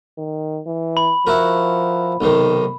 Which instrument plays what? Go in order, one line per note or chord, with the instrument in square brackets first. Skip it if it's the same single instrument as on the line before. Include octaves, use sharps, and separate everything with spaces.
[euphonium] D#3
E3
[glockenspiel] B5
[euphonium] F3 [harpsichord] E4 F#4 A#4
[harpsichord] B1 C3 D#3 [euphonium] D#4